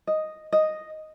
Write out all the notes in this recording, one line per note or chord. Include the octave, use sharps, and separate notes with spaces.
D#5
D#5